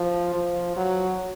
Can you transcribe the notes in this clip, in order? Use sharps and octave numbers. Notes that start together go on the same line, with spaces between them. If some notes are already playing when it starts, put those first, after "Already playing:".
Already playing: F3
F3
F#3